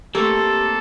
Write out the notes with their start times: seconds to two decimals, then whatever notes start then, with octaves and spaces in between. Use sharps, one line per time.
0.15 A3 A#3 C4 G4 A4